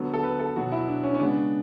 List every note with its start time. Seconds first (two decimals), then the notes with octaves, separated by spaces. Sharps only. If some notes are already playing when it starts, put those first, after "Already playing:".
Already playing: D3 F#3 B3 A4
0.14 A4
0.23 B4
0.39 A4
0.56 B2 F#3 B3 F#4
0.72 E4
0.88 D4
1.03 C#4
1.14 C#4
1.19 C#3 G#3 B3 D4